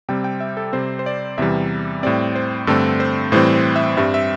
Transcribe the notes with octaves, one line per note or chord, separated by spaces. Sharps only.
C3 G3 C4 G5
G5
E5
A4
C3 G3 C4 C5
C5
D5
E2 C3 E3 G3 E5
A2 G3 C4 D5
C5
G2 D3 A3 C4 A4
C5
A2 E3 G3 C4 C5
C5
E5
G2 G3 C4 E5
E5